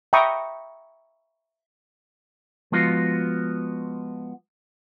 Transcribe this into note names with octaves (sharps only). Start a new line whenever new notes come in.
E5 G5 A#5 B5 C#6 D#6
F3 G#3 B3 F4 F#4